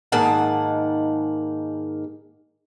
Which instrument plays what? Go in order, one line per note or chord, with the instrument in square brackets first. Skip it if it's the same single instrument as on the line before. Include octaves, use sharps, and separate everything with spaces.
[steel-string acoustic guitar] G#2 D#3 G#3 A#3 F#5 A5